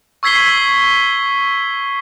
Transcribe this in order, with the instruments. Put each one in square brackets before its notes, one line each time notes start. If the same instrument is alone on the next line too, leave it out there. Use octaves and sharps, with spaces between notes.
[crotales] C#6 E6 G#6 B6 C7 G7